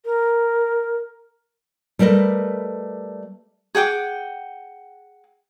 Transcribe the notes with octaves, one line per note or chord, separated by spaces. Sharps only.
A#4
G3 A3 A#4 B4 D#5
G#4 F#5 G5 D6